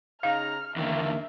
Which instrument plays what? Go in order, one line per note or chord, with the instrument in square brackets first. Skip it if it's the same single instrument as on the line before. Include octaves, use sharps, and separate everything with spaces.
[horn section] C#3 D#4 A#5 [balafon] F5 [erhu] F6
[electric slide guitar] E2 D3 [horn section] D#3 A#3 [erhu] E5